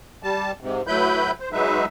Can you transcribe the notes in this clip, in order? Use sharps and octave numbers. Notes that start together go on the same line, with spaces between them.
G3 A5
G#2 C3
A2 F#3 E4 B4 B5 G6
C5
F#3 G#3 D#4 B4 E5